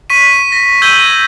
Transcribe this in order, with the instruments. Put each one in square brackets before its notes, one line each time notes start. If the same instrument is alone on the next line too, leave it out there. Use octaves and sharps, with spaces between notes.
[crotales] C#6 B6 D#7
A#6
E6 G6 G#6 D#7 F#7 G7